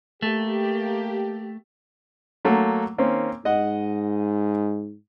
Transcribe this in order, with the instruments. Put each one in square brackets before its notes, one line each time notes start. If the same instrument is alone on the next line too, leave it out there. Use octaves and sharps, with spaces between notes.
[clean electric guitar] A3 [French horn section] A#3 G4
[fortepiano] F#3 A3 A#3
[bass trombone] D#3 [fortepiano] A#3 C4 C#4
[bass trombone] G#2 [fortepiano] D#5 F#5